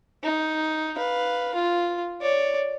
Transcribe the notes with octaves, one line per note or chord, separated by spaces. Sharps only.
D#4
B4 F5
F4
C#5 D5